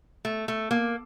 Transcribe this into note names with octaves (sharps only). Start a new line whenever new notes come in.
A3
A3
A#3